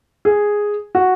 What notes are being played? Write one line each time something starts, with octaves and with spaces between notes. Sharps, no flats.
G#4
F#4